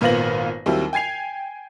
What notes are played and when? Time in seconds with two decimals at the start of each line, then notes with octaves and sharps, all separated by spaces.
0.01 G#1 A#2 B3 F4 A#6 F#7
0.66 D#2 F#3 G3 C4 E4
0.93 G5 G#5 G#6 C7 F7